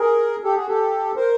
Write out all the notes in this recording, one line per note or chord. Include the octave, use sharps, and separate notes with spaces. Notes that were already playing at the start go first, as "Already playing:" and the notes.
Already playing: G#4 A#4
G4 A4
F#4 G#4
G4 A4
A#4 C5